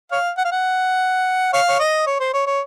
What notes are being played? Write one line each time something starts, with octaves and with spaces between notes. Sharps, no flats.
C#5 F5
F#5
F5
F#5
C#5 F5
C#5
D#5
C#5
C5
C#5
C#5